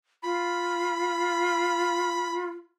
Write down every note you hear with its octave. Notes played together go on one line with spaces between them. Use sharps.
F4 B5